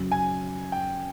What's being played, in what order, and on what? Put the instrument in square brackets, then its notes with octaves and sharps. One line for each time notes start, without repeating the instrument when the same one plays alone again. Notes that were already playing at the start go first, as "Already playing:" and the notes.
Already playing: [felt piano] F#2 C#3 F#3
[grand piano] G#5
G5